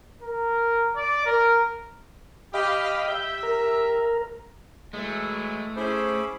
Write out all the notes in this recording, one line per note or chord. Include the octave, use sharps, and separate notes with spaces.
A#4
D5
A#4
G4 D#5 F5 B5
G4 E5 G6
A#4
E3 F#3 G#3 A3
C#4 E4 G#4 C5 B5 D6